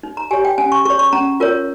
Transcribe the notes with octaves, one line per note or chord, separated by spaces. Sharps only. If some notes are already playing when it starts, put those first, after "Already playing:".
D#4
A#5
G4 C#5 G#5
G5
C#4 G#5
C#6
G#4 C#5 C#6
C#6
C#4 A#5
F4 A#4 C#5